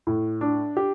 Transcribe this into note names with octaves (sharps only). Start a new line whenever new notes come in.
A2
D4
G4